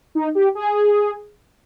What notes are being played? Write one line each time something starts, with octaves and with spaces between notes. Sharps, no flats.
D#4
G4
G#4